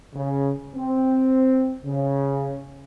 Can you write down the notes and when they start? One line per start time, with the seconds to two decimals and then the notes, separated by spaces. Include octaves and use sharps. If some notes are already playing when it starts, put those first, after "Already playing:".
0.14 C#3
0.75 C4
1.85 C#3